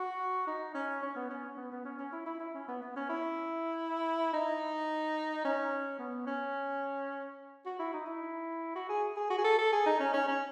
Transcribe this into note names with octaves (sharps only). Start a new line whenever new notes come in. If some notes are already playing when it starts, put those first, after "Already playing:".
Already playing: F#4
D#4
C#4
C#4
B3
C#4
C#4
B3
B3
C#4
C#4
E4
E4
E4
C#4
B3
B3
C#4
E4
D#4
C#4
B3
C#4
F#4
E4
D#4
E4
F#4
G#4
G#4
F#4
G#4
A4
A4
G#4
D#4
C#4
C#4
C#4